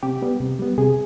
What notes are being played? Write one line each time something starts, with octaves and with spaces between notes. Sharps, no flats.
C3 G4
G3 B3
C3
G3 B3
C3 G#4